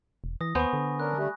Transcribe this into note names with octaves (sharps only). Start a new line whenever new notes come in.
E1
E3 D#6 A#6
D#2 B3 C5 G#5 B5 C#6
D3
C#4 D4 A#4 F#6
G3 A3 G4 F#6